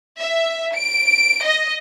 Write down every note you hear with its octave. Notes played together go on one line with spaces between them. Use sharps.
E5
D7
D#5